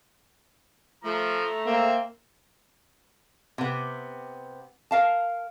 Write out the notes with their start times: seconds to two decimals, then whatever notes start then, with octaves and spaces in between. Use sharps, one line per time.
1.05 F3 A3 A#5
1.66 A#3 C4 E5
3.58 C3 B3
4.91 A#4 F5 A5